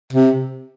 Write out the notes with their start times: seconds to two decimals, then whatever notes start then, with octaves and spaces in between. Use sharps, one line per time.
0.13 C3